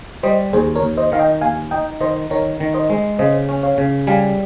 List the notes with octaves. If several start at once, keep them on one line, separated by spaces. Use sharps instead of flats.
G3 C5 D#5
D#2 G#4 C5
A#4 C#5
D#2
C5 D#5
D#3 F5
D#5 G5
D#2 F5 G#5
D#4 D#5 G5
D#3 C5 D#5
D#3 A#4 C#5
D#3
C5 D#5
G#3
C#3 C5 D#5
C#4
C#5 F5
C#3
G3 F5 G#5